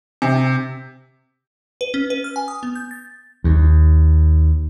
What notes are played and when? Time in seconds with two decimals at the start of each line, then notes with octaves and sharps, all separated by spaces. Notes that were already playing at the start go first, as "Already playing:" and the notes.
0.22 C3
1.81 B4
1.94 C#4
2.10 B4
2.24 F6
2.36 G#5
2.48 D#6
2.63 B3
2.75 G6
2.91 A6
3.44 D#2